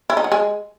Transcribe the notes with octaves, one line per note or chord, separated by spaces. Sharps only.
E4
D#4
F#3
G#3